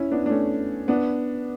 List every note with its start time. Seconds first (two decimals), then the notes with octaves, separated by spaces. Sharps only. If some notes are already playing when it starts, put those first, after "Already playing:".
Already playing: C#4 E4
0.11 B3 D4
0.26 D4
0.30 A3 C#4
0.88 B3 D4